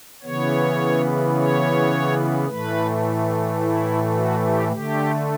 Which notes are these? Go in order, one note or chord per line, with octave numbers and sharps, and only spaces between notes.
C#3 E3 B3 C#5
C#5
A2 E3 A3 B4
E4
F#4
G4
D3 A3 G4